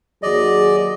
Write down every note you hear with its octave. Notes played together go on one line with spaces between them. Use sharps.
D#2 F#3 G#4 D5 D#5